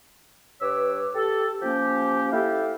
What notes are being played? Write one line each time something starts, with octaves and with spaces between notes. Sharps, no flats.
G2 B4 C#5 D6 E6
G4 A4
F3 A#3 C#4 G4
E4 G4 A4 F5 G5